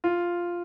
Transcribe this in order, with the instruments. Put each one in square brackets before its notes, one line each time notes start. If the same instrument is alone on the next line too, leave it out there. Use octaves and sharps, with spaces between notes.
[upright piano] F4